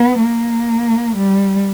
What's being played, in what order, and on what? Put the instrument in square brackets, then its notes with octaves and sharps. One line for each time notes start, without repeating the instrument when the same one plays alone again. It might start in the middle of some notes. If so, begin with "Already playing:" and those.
Already playing: [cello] B3
A#3
G3